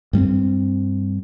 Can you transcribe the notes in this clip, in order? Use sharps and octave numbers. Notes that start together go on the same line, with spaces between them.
G2 G3 B3 C4